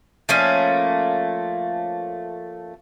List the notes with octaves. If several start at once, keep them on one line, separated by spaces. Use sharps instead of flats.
F3 A3 A#3 C#4